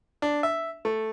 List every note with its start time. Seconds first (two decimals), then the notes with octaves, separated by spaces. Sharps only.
0.22 D4
0.43 E5
0.85 A3